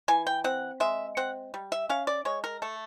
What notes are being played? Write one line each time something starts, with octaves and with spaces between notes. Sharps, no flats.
E3 G#5
G5
C4 F#5
G#3 E5
C4 F#5
G3
E5
C#4 F5
D5
G#3 C#5
A#4
A3 A4